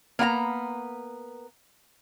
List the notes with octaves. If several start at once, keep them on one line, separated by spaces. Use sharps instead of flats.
A#3 B3 F#5 A#5